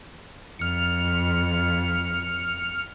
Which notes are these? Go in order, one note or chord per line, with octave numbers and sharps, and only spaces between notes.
F2 F6 C#7